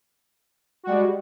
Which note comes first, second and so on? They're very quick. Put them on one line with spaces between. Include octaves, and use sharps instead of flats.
F#4 G3 G#3